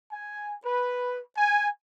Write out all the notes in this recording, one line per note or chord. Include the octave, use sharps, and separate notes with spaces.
G#5
B4
G#5